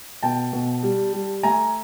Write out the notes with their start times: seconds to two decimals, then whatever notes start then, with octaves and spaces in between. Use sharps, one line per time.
0.22 B2 G5 A5
0.53 B2
0.83 G3
1.13 G3
1.43 A3 G#5 A#5